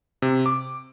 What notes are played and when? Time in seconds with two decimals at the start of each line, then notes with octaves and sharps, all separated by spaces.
0.22 C3
0.46 D6